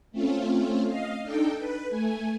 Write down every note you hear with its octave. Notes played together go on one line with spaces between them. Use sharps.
A3 C4 C#4 F4
D#5 F5
D4 D#4 A4 G5
B4
A3 G#5